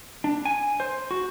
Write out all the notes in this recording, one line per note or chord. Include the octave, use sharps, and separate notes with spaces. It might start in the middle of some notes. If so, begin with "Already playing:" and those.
D4
G#5
C5
F#4